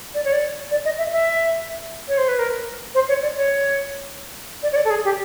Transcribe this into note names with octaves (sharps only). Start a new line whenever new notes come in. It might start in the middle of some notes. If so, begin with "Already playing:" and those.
D5
C#5
D5
D5
D#5
E5
E5
C#5
C5
B4
A#4
C5
C#5
D5
C#5
D5
C#5
D5
A4
G#4
G4